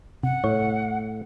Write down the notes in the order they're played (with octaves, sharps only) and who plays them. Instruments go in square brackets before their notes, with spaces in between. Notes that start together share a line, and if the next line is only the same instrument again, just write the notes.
[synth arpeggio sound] C3 [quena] F#5
[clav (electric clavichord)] A2 [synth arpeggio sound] C#5